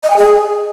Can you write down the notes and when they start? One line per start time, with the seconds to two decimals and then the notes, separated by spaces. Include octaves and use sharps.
0.04 D#5
0.10 G#5
0.17 G#4